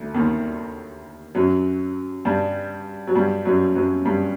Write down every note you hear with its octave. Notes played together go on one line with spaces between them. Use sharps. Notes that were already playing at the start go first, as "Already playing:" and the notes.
Already playing: D2 D3
D#2 D#3
F#2 F#3
G2 G3
F#3
G2 G3
F#2 F#3
F#2 F#3
G2 G3